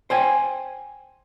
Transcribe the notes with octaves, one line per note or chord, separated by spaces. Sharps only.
C5 G5 G#5